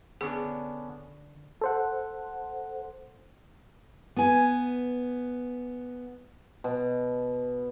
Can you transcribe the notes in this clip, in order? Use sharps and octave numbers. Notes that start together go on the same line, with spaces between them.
D3 B3 C#4 D4 G#4
A4 C5 F#5
B3 G#5
B2